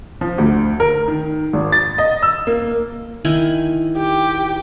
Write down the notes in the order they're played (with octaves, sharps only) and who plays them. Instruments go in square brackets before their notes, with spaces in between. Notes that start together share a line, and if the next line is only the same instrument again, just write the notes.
[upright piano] F3
D2
A#4
D#3
G#1
A6
D#5
E6
A#3
[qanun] D#3 E4 G#5
[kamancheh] G4